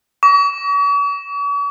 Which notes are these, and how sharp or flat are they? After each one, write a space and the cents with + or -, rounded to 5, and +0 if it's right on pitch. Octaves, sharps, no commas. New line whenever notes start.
C#6 +45